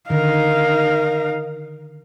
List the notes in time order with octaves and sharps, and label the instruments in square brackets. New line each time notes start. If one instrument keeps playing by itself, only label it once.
[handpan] D3 D#3 [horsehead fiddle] D#4 F5 [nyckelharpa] A#4